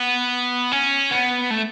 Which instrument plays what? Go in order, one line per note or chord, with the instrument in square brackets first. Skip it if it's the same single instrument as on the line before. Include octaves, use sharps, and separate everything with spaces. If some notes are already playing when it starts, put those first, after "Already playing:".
Already playing: [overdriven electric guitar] B3
C#4
B3
A3